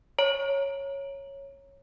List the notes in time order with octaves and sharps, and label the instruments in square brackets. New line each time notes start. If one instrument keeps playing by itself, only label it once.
[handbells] C#5 A#5